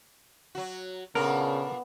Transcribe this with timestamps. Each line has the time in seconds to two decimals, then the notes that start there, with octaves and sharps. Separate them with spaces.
0.55 F#3 F#4
1.15 A#2 C#3 B3 D4 A4 A#4